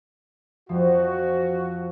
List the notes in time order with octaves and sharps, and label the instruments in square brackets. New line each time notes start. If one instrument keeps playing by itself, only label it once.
[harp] F2 F3 [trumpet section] F#4